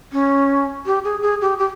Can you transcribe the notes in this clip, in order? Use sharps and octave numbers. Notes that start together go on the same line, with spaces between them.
C#4
G4
G#4
G#4
G4
G4